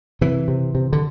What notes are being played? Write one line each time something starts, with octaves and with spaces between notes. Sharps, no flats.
C3 E3
C3
C3
D3